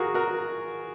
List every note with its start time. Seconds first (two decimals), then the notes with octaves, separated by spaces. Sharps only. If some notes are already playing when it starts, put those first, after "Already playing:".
Already playing: F4 F#4 G#4 A#4
0.14 F#4 A#4